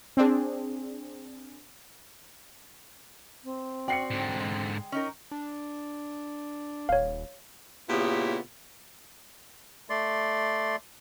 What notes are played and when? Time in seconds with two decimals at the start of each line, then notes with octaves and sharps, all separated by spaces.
0.17 C4 D4 G#4
3.44 C4
3.88 F#4 D5 G5 C7 C#7
4.11 G#2 D3
4.40 G#3
4.92 C#4 D#4 A#4
5.31 D4
6.89 D#1 C#5 F5
7.89 A#2 C#3 B3 E4 G4
9.90 A3 D5 C6